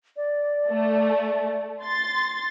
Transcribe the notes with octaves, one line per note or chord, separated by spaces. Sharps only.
D5
A3
C6 A6